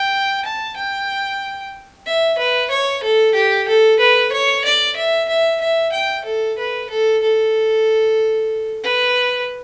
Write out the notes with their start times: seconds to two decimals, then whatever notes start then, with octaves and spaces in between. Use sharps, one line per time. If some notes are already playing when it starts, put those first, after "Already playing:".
Already playing: G5
0.45 A5
0.76 G5
2.06 E5
2.38 B4
2.70 C#5
3.03 A4
3.34 G4
3.68 A4
3.99 B4
4.32 C#5
4.64 D5
4.96 E5
5.29 E5
5.61 E5
5.92 G5
6.24 A4
6.58 B4
6.90 A4
7.22 A4
8.84 B4